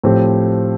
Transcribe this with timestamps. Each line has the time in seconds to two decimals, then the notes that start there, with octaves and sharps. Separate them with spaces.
0.04 A2 F3 C4 G4